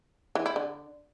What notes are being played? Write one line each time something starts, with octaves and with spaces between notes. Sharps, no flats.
E3
E4
D3